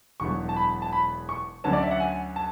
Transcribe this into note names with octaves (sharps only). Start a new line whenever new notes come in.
E1 E2 D3 F#3 C#6
A5
B5
A5
B5
C#6
D2 D3 F#3 C#4 A5
D5
E5
F#5
G#5
A5